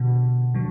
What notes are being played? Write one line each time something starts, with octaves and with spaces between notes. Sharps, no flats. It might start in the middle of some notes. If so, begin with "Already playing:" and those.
Already playing: B2 D3
D3 F#3